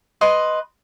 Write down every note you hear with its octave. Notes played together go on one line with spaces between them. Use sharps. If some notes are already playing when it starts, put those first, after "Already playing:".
B4 D#5 C6